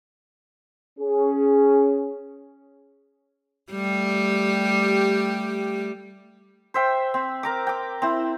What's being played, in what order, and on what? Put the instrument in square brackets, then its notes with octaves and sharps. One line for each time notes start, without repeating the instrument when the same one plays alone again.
[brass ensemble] C#4 G#4
[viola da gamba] G3 A3 G4
[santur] C5 E5 G5
C4
A#4 A#5 D6
G5 D6
C4 E4